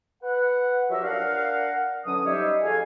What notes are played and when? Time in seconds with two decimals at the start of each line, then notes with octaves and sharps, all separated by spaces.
0.23 B4 F#5
0.90 F3 F#3 G4 A#4 E5
1.03 D4 A#4 F5 F#5
2.05 D3 E3 F#3 C#4 D#6
2.26 G3 D#4 G4 C5 C#5 E5
2.62 F2 A3 G#4 F5 G#5